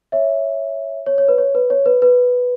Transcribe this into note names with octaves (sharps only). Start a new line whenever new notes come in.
C#5 E5
C#5
C#5
B4
C#5
B4
C#5
B4
B4